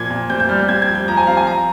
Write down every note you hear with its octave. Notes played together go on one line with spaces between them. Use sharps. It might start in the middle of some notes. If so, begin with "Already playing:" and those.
Already playing: A#2 F3 G#6
A#2
C4 G6
G6
G3 F6
G6
C4 G#6
G#6
F3
G6
F3 A#5
G#5
C4 F5
G#5
F3 A#5